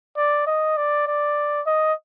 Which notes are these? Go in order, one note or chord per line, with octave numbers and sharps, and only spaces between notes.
D5
D#5
D5
D5
D#5